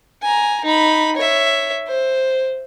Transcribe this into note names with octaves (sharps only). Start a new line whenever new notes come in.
G#5 A#5
D#4 B5
C#5 E5
C5